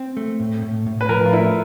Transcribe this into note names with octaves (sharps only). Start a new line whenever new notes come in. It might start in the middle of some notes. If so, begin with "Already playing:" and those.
Already playing: C4
A3
A2
A2
A2
B4
F3 A#4
F4
A3 E4